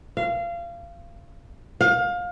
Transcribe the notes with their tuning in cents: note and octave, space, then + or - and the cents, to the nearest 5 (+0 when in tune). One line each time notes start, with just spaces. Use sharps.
F5 -25
F5 +25